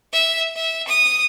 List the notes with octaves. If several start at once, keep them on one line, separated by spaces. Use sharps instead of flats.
E5
E5
D#6